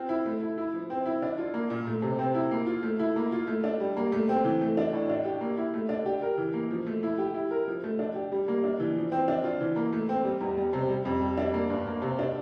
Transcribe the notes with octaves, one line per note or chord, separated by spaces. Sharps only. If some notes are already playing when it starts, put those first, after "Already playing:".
Already playing: C4 F4
E4
A3
E4
E4
F3
C4
E4
D4
F4
A#3
A#2
A3
C3
C4
E4
A#3
F4
A3
E4
A#3
F4
A3
D4
G3
A#3
A3
C4
E3
A3
D4
A2
D4
G4
A#3
E4
A3
D4
G4
A#4
E3
A#3
F3
A3
E4
G4
E4
A#4
F3
A3
D4
G4
G3
A#3
D4
E3
F3
C4
D4
F4
E3
A#3
A3
C4
G3
E2
G3
C3
G3
F2
G3
D4
A#3
G2
A#3
C3
D4